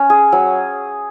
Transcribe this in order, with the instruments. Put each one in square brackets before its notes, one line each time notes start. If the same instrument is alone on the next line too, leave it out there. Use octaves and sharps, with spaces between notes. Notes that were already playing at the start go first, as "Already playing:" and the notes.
Already playing: [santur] C#4
G#4
F#3